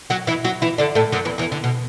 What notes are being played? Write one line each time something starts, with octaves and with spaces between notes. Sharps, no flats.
F#3 F#4
E3 E4
F#3 F#4
E3 E4
D3 D4
A2 A3
F#2 F#3
E2 E3
E2 E3
D3
B2